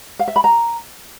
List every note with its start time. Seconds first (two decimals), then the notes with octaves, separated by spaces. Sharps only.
0.19 F5
0.28 E5
0.36 B5
0.44 A#5